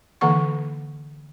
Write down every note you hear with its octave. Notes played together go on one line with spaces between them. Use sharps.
D3 E3 A#3 F#5 C#6